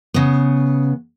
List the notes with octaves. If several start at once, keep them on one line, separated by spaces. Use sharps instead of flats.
C#3 B3